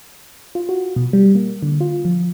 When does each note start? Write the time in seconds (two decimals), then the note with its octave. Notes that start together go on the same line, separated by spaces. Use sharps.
0.55 F4
0.69 F#4
0.96 B2
1.13 G3
1.35 A#3
1.63 D3
1.81 F4
2.05 F3